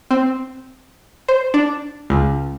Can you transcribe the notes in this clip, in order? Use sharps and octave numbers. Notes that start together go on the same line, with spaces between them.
C4
C5
D4
C#2